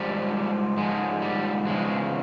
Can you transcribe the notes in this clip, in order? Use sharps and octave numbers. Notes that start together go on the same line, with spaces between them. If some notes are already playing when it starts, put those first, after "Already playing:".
Already playing: G#2 F3 G3
G#2 F3 G#3
G3
E2 C#3 F3 G#3